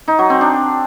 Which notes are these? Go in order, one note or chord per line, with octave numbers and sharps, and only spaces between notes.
D#4
F#3
C4
D4